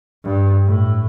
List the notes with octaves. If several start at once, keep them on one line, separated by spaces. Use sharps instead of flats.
G2
A2